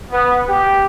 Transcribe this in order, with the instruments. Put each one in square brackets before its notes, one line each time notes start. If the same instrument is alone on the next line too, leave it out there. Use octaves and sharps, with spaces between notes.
[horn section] B3
G4